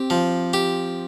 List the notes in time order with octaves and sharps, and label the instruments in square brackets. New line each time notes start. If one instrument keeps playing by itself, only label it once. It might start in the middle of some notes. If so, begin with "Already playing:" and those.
Already playing: [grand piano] C4 [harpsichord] G4
[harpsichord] F3
G4